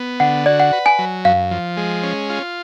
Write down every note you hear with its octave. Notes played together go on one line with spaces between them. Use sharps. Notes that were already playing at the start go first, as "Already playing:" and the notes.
Already playing: B3
D3 F#5
F#4 D5
F#5
B4
G#5
F#3
F#2 F5
F3
G#3
C#4
F4